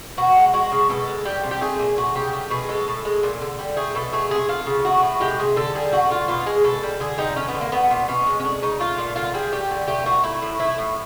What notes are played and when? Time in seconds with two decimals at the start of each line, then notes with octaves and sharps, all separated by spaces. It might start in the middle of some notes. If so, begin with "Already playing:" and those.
0.17 B2 F#4
0.36 G#3
0.53 G#3 F#4
0.72 C#3
0.90 B2 A4
1.07 G#3
1.25 G3 G4
1.44 C3
1.51 G4
1.61 A3 G#4
1.79 A#2
1.97 A3 F#4
2.15 C#3 G4
2.33 A3 G4
2.50 B2 G#4
2.69 G#3 A4
2.88 A2
3.05 G#3
3.23 A#2
3.41 D3
3.59 G3
3.77 A3 G#4
3.95 B2 A4
4.13 A3 G#4
4.31 C3 G#4
4.49 A3 F4
4.67 C#3
4.85 A3 F#4
5.03 A2
5.21 G#3 G4
5.39 C3 G#4
5.56 D3 A4
5.75 G3 G#4
5.92 A3 F#4
6.10 D3 F4
6.28 B2 F4
6.46 G#3 G#4
6.64 B2 A4
6.83 G3
7.00 D3 G#4
7.18 G3 D#4
7.36 A3 C#4
7.48 B3
7.55 D3
7.61 A#3
7.72 A3 B3
7.91 A#2
8.08 B2 C#4
8.26 G#3
8.40 C#4
8.44 A3 D4
8.62 C#3 D#4
8.80 A3 F4
8.98 A#2
9.16 D3 F4
9.34 G3 G#4
9.52 A3 G4
9.70 D3
9.87 A3 G4
10.06 A#2 F#4
10.24 A3 E4
10.42 A2
10.59 A3 E4
10.78 A2